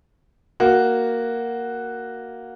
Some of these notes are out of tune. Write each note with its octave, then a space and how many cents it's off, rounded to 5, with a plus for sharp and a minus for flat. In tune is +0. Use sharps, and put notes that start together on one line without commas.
A#3 +0 F#4 +0